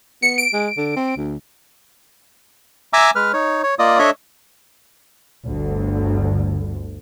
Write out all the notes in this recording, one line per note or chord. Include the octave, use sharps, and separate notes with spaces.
B3 C#7
D7
G#3
D3
C4
D2
E5 G#5 A#5 D6 E6
G#3 B4 F6
D#4 C#5
C#5
A#3 F4 D5 D#5 D#6
D4 A4 C#5 D#5 E5
G1 D2